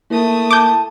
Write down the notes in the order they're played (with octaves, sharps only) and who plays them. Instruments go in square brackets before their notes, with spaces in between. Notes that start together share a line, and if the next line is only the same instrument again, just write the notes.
[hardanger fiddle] A3 D#6 [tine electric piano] A#3 E4 A#4
[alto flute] A5 [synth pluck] D6 G6